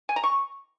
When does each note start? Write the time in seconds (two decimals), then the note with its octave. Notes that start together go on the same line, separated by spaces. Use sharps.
0.09 G#5
0.16 A#5
0.24 C#6